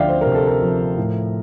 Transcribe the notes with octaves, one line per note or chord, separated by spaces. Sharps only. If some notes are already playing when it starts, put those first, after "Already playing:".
Already playing: D2 F3 D5 E5 F5 G5
C5
A#4
C3
A4
A#4
F3
A2